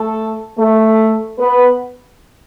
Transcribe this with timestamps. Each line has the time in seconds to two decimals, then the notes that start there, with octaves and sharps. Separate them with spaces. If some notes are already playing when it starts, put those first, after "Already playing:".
Already playing: A3 A4
0.57 A3 A4
1.39 B3 B4